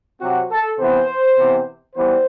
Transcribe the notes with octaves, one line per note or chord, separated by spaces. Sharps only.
C3 F#3 C4 F#4
A4
C3 E3 B3 C5
C3 E3 B3
E3 G3 B3 C5